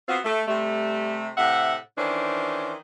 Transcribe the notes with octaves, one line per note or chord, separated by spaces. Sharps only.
B3 C4 F4 F#4
A3
C3 G3 A3
A2 C3 E5 F#5
D#3 E3 C#4 D4 C5